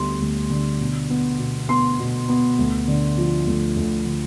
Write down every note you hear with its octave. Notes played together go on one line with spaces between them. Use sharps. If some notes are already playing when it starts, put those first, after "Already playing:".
Already playing: D2 D3 G3 B3 C6
D2
D3
B2
B3
B2
B3 C6
B2
B3
D2
D3
F3
D2
D2
D3